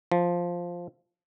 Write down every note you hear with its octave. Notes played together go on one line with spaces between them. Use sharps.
F3